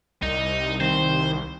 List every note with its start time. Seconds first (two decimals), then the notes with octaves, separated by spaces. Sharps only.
0.23 C2 D#4
0.80 D#3 C4 C5